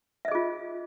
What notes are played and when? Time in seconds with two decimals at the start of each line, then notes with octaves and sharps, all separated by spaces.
0.25 E5
0.28 D#5
0.31 G#4
0.35 F4